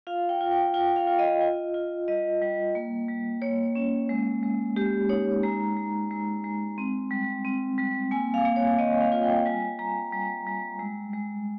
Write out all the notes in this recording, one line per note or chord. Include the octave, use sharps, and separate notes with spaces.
F4 F5
G5
F4
G5
F4 G5
F5
F4
D#5
F4
F4
G3 D#5
G3
A#3
G3
A#3 C#5
C#4
G#3
G#3
G#3 G4
D#4 C#5
G#3 A#5
G#3
G#3
G#3
C4
G3
C4
G3
A#3 G#5
F5
A#3
C#5
A#3 D#5
F5
F4
G5
G3 G#5
G3 A#5
G3
G3
G#3
G#3